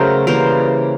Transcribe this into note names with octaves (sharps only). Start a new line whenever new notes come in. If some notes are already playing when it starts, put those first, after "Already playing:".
Already playing: C#3 F#3 A3 A#4 C5
C#3 E3 G3 A#3 A#4 C5